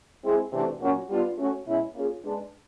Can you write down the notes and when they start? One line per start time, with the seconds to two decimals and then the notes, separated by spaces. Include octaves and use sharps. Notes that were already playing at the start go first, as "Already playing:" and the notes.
0.24 G#3 C4 E4 G#4
0.52 C3 E3 A3 D4 F#4
0.81 A#2 F#3 A#3 C#4 F#4
1.08 G3 B3 D4 F4
1.38 A3 C#4 F#4
1.66 B2 G#3 C#4 E4
1.94 A#3 C#4 F4 G#4
2.24 G#3 B3 D4